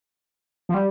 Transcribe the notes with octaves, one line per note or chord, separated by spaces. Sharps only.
F3
G3